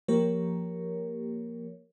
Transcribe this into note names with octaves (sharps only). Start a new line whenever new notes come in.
F3 A#3 G4 A#4 C#5